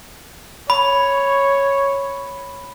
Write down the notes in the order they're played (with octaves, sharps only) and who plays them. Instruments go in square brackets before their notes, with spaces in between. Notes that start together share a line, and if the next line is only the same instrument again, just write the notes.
[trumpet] C#5 [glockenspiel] B5